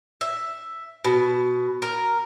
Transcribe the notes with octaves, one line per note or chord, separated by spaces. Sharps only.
E5
B2
A#4